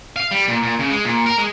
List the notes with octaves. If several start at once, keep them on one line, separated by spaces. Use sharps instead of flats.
F5
G3
A#2
A#2
C#3
G#3
A#2
A#4
G#3